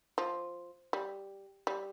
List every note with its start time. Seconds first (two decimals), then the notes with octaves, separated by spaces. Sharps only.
0.18 F3
0.93 G3
1.67 G3